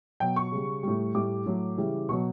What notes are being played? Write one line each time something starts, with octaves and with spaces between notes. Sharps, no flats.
B2 F#3 G5
C#6
C#3 G3
A2 G3
A2 G3 D6
A2 F#3
C#3 E3 G3
B2 F#3 C#6